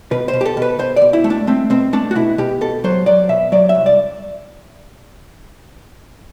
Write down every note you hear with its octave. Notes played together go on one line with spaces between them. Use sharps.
B2 B4
C5
B2
G4
A4
B2 B4
B2 C5
D5
B2
E4
A3
D4
A3 C4
B2 C4
A3 D4
F#4
B2 E4
B2 G4
B2 A4
F#3 C5
F#3 D5
B2 E5
F#3 D5
E5
C2
D5